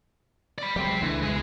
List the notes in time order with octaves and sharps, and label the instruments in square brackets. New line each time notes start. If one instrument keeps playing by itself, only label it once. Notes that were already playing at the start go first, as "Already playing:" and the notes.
[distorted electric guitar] D5 B5
[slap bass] F#3 G#3 [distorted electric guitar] G4 C5
[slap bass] C#2 A3 D4 [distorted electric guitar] E3
[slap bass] C#2 B2 [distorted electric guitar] G#3 G#5